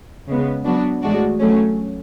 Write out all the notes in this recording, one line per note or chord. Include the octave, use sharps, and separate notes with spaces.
C#3 G#3 B3
F#3 B3 D4 F#4
A2 E3 G#3 D4 F#4
F#3 A3 C#4